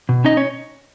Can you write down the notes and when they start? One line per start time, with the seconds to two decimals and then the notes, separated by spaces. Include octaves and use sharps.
0.09 B2
0.24 C#4 D#4 D#5
0.37 C#4 C#5